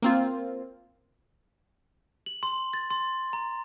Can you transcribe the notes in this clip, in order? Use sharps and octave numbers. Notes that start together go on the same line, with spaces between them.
A#3 C4 F4
F#7
C6
A6
C6
A#5